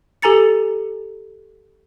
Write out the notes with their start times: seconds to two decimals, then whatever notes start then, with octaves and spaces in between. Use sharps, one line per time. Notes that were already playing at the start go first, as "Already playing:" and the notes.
0.22 G4 A4 G#5 A#5 A6 C#7